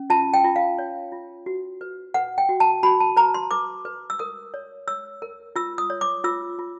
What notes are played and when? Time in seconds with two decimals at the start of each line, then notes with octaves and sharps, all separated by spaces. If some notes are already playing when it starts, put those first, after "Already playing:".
Already playing: C#4
0.10 F4 A5
0.34 G5
0.44 F4
0.56 F5
0.78 C#5
1.12 F4
1.46 F#4
1.81 B4
2.14 B4 F#5
2.38 G5
2.49 F#4
2.60 A5
2.83 F#4 B5
3.00 A5
3.17 B4 A#5
3.34 C6
3.51 B4 D6
3.85 B4
4.10 E6
4.19 A#4 D#6
4.54 C#5
4.87 C#5 E6
5.22 A#4
5.56 F4 E6
5.78 D#6
5.90 C#5
6.01 D6
6.24 F4 E6
6.59 F4